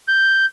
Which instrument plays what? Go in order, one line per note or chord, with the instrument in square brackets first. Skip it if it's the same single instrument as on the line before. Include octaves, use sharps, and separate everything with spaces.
[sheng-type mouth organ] G6